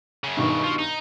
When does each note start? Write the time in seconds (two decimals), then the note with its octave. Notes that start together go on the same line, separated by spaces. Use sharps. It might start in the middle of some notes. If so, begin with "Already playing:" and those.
0.24 F#2 C#3
0.37 G2 B2 D#3 C#6
0.64 F3
0.79 D#4